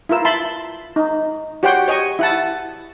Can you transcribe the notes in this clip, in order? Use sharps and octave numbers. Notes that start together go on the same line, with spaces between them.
E4 F4 A#4 E6
E5 A5 B5 C6
D#4
F#4 G4 C#5 F#5 G5 C6
C#5 D#5 G#5
E4 F#5 A5